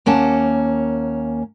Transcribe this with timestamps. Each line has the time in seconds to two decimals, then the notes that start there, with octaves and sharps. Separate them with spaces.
0.06 D#2 A#3 C#4 F#5 A5